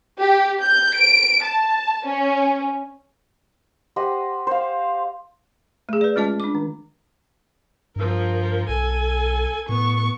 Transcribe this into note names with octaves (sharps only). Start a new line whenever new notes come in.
G4
G6
D7
A5
C#4
G4 C5 D#5 F#5
C5 F5
A3 G#4
B4 D5
G#3 C#4 F4 D#5 A5
D4 D6
D#3
G2 F3 A#4
B1 A4 G#5
A2 B3 C#6